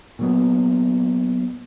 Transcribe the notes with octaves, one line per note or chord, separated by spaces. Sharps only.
A#2 F#3 B3